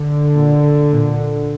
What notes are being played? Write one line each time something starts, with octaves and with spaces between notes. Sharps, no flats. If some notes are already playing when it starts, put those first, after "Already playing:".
Already playing: D3
A#2
A#2